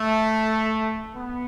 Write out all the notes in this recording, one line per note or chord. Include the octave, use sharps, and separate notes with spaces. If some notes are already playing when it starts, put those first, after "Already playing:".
Already playing: A3
B3